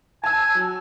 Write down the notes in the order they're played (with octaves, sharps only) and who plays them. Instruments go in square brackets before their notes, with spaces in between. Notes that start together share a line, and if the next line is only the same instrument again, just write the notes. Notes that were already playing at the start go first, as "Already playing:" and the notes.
[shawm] G#5 [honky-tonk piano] A5 E6
[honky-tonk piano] F#3